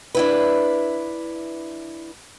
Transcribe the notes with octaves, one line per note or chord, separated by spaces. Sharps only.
D4 E4 B4